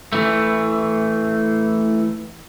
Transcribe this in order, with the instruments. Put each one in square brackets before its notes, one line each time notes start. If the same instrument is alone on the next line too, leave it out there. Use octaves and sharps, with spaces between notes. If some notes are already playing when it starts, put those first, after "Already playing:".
[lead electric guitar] E3 A3